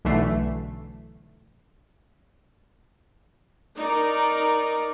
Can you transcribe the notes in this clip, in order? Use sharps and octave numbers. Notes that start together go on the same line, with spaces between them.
B1 D3 E3 A3 C7
D#4 A#4 D5